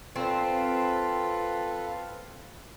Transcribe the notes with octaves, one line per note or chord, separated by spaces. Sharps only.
C4 F4 A4 B4